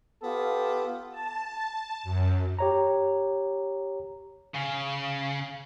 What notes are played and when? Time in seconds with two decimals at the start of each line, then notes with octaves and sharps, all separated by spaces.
0.23 B3 F4 G4 A4
1.10 A5
2.03 F#2
2.59 G4 C#5 A#5
4.55 C#3